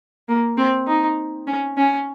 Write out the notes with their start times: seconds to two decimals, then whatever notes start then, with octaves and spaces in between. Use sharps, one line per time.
0.28 A#3
0.57 C4
0.87 D#4
1.47 C#4
1.78 C#4